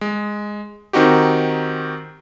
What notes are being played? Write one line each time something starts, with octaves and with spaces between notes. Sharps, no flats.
G#3
D#3 C4 D#4 F#4 G4